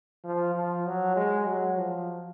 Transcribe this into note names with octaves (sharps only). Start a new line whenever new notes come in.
F3
F3
F#3
G#3
F#3
F3